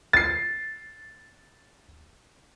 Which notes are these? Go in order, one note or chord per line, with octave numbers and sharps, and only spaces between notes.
A6 C7